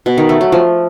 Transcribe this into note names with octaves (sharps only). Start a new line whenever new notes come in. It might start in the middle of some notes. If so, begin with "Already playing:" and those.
B2
D#3
A3
F#3
F3